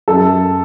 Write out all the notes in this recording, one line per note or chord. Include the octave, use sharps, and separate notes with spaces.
F#2 A4